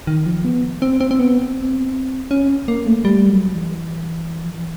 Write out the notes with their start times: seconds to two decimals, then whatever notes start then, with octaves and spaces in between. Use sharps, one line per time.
0.07 D#3
0.26 F3
0.45 B3
0.82 C4
1.01 C4
1.11 C4
1.19 B3
1.38 C4
2.31 C#4
2.68 A#3
2.86 A3
3.05 G3
3.29 F#3
3.55 E3
4.44 F3
4.54 E3